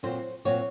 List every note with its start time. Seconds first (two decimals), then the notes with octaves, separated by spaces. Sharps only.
0.03 A#2 F#3 C4 C5
0.45 A#2 F#3 C4 C#5